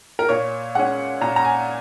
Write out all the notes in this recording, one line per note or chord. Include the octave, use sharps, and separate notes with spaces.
A#4
A#2 C#5
G#3 C#4 F#5
A#2 A#5
A#5
G#5